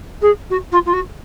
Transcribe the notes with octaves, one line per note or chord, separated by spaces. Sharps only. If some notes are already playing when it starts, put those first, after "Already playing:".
G#4
F#4
F4
F4
F#4